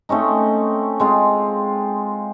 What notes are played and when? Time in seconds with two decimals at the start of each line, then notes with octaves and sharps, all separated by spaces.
0.09 A3 C4 C#4 D#4
1.00 G#3 C4 F4